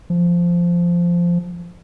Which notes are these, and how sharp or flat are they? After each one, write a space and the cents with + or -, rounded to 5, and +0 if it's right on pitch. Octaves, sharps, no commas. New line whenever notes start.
F3 -10